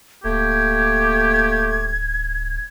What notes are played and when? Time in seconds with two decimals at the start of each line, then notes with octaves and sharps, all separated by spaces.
0.24 D1 A3 A#3 G4 G#6